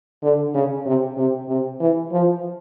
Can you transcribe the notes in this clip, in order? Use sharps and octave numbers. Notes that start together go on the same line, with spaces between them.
D3
C#3
C3
C3
C3
E3
F3